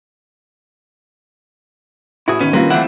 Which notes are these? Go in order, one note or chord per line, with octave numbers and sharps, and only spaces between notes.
A1 E4 F#4 G#4
B2 D#3 C#4 B4
G3 A#3 C4 F4 A#4 B4
E3 A3 C4 E4 F#5